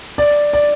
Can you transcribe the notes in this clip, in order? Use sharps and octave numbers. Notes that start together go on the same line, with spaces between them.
D5
D5